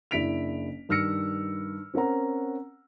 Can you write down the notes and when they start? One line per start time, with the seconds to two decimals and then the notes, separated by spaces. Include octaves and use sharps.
0.11 F#1 D4 E4 B6 D7 F7
0.89 G2 D#3 E6 F6 A#6 C#7
1.94 C4 C#4 A#4 F#5 A#5